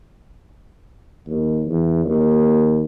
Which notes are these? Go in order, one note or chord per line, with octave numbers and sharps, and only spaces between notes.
D#2
E2
D#2